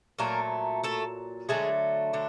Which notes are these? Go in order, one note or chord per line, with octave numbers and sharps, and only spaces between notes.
A#2 F#3 A3 A#3 A#4
A3 A4
D3 F#3 G#3 A3 G#4
D3 D4